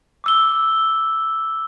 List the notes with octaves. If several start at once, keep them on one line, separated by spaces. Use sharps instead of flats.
D6 E6 G7